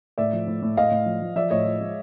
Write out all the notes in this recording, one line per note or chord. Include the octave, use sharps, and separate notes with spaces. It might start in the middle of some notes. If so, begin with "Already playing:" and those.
A2 D5 E5
F3
A2
A2
A2 D#5 F5
A2
F3
F3
F3 D5 E5
A2 C#5 D#5
F3
G#3